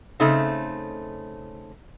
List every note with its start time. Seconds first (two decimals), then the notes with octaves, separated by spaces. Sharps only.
0.20 C#3 A3 C4 D#4